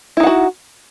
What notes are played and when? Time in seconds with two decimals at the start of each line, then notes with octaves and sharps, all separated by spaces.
0.17 E4
0.20 D#4
0.23 F#5
0.27 F#4